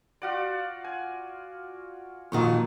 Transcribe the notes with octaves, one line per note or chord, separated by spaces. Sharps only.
F4 F#4 D5
G#5
F2 A#2 D#3 F3 F#3 C#6